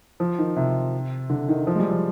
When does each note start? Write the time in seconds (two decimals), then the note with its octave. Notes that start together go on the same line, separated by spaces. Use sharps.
0.20 F3
0.38 D#3
0.57 C3
1.30 D3
1.48 D#3
1.67 F3
1.75 G#3
1.79 G3
1.91 F3